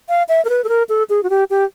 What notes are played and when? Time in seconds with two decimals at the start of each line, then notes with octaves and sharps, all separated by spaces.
0.09 F5
0.29 E5
0.45 A#4
0.49 B4
0.64 A4
0.69 A#4
0.89 A4
1.10 G#4
1.23 F#4
1.30 G4
1.50 G4